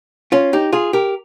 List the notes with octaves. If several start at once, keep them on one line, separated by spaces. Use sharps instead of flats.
C#4 F4
D#4 G4
F4 G#4
G4 A#4